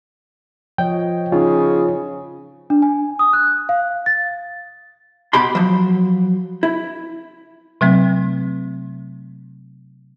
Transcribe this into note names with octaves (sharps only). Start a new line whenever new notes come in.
F3 C#5 D#5 G5
C#3 C#4 D#4 F4
D4
G#5
D#6
F#6
F5
A6
B2 G4 A5 B5 C6
F3 F#3
E4
C3 F#3 A3 C4